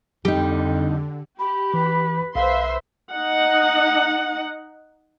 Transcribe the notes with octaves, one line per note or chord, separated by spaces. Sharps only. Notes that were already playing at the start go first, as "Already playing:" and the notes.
F2 D3 G3 D#4 G4
G4 B5
E3 B4
B1 B4 C5 E5 F5 C6
D#4 F#5